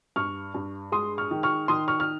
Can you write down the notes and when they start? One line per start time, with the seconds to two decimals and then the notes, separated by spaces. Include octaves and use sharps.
0.16 G2 C#6 F6
0.54 G2
0.92 G#3 C6 D#6
1.18 C#6 F6
1.31 D#3
1.43 C#6 F6
1.68 D#3 C6 D#6
1.88 C#6 F6
2.00 F6